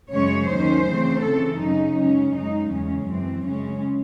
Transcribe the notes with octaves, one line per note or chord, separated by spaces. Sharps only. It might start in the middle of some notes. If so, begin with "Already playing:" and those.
F#2 C#3 G#3 C#4 C#5
D#2 D#3 F#3 C#4 C5
C#3 E3 A3 C4
C#3 E3 C4 A4
F#2 C#3 F#3 C#4 D#4
F#2 C#3 G#3 C#4
F#2 C#3 G#3 D#4
E2 C#3 G#3 C#4
F#2 E3 C4
F#2 C#3 G#3 C#4